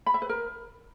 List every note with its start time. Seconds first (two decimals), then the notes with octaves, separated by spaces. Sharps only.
0.06 B5
0.14 E5
0.22 B4
0.29 A#4